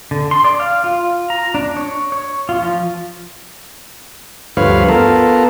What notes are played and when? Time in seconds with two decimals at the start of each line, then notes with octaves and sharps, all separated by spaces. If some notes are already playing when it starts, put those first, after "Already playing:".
0.11 D3
0.31 C6
0.44 D5
0.60 F5
0.84 F4
1.30 A#5
1.55 D4
1.77 C#5
2.12 C#5
2.49 F4
2.62 F3
4.57 D2 G2 F3 B4 C#5 F5
4.88 B3 F4 A4 A#4